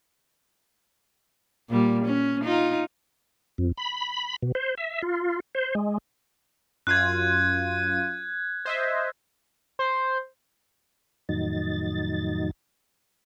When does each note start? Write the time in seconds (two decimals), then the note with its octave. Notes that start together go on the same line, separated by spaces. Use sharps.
1.70 A#2 G3
2.05 C#4
2.44 D#4 F4
3.58 F2
3.77 B5
4.42 B2
4.55 C5
4.77 E5
5.02 F4
5.55 C5
5.75 G#3
6.87 F#2 F4 F#6 G#6 D#7
8.65 C5 D#5 E5
9.79 C5
11.29 F2 A2 D#3 F#3 D#4 A6